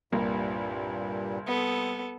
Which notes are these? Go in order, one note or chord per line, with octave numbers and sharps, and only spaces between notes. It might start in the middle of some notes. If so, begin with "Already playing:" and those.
C2 G2 A#2 A#3
B3 A4 D#6